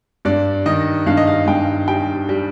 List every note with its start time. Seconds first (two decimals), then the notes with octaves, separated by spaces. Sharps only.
0.25 G2 D5
0.66 D#3 D#5
1.06 G2 F5
1.17 D#5
1.27 F5
1.47 G2 G5
1.88 G3 G5
2.29 G3